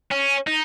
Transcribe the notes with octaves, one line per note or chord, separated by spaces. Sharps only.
C#4
D#4